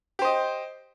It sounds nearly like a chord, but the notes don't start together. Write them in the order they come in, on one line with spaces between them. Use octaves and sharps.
G4 C5 D#5